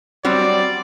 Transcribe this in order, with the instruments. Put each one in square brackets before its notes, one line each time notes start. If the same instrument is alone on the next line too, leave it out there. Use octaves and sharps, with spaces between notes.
[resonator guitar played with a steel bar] F#3 G3 C4 [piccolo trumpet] D5